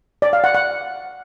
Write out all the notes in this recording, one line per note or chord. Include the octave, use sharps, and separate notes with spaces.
D5
F5
F#5
F#5